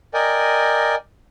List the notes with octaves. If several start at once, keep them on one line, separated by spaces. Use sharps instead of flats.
A#4 D5 D#5 G5 G#5